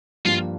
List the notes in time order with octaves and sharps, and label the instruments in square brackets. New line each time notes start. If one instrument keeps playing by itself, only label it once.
[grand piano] G2 F3 A#3 D4 G4 [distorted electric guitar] F4